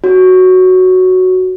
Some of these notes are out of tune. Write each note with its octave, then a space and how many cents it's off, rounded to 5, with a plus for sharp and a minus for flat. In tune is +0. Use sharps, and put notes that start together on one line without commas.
F#4 +0 C#5 +0